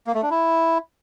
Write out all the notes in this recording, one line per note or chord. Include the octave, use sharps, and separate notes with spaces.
A#3
A3
D4
E4